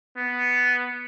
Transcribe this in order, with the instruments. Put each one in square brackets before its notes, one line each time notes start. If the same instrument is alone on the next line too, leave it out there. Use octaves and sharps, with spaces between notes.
[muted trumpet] B3